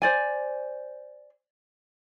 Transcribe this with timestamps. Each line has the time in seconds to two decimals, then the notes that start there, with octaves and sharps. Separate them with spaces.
0.02 C5 D5 G#5